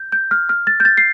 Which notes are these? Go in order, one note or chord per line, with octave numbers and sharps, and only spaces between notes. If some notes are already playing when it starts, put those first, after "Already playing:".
Already playing: G6
G6
F6
F6
A6
G6
A6
C7